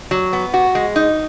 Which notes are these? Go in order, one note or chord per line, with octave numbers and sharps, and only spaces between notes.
F#3
B3
F#4
G#3
D#4